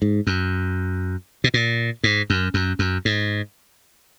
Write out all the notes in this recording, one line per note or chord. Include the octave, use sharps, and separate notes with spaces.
G#2
F#2
B2
A#2
G#2
F#2
F#2
F#2
G#2